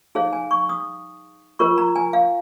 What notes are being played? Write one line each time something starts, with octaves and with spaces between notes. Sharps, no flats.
D#4 G#4 C#5 F5
G#5
C#6
D#6
F4 A#4 C#5 C#6
A#5
G#5
F5